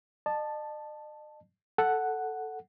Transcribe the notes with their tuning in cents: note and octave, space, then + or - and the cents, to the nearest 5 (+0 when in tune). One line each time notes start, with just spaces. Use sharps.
D#5 -45 A5 +0
A4 +0 F#5 +0